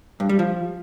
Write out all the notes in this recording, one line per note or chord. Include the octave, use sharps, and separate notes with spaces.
G2
G3
F3